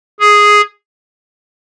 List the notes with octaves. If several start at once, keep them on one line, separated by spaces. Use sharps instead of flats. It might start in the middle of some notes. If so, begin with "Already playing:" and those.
G#4